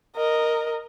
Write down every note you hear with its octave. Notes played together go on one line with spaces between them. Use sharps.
A#4 D#5